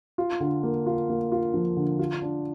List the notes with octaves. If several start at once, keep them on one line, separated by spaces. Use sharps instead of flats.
F4
D3
A#3
F4
A#3
F4
F3
D3
F4
D4